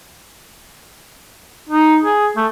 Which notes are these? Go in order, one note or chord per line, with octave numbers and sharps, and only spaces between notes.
D#4
G#4
A3